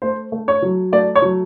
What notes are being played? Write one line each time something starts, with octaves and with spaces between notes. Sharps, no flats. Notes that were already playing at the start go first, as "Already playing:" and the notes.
A3 C5
A3
C#5
F#3
A3 D5
C#5
F#3